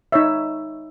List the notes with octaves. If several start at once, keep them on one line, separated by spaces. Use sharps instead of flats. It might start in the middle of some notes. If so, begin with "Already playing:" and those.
D#4 C#5 E5